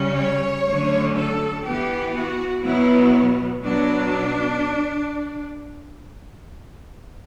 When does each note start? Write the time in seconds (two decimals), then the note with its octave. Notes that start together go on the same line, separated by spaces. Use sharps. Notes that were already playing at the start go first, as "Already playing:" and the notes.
Already playing: C#3 G3 C#4
0.17 C#5
0.67 D3 F#3 A3 C#4
1.16 A4
1.65 E3 B3 G4
2.15 F#4
2.64 B2 F#3 B3 E4
3.62 B2 F#3 B3 D4